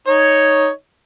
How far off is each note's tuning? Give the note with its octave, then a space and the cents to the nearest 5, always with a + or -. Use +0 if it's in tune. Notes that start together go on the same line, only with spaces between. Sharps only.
D#4 +0 C#5 +0